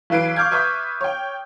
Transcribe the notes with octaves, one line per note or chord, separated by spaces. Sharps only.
B1 E3 B4 C7 D7
C#6 D6 F6 G6 G#6
B4 E5 C#6 D#6 G6 B6
C#5 G5